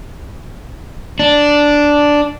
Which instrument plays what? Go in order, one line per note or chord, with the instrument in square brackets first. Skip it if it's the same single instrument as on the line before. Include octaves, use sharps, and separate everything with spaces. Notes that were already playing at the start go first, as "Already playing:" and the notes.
[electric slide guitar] D4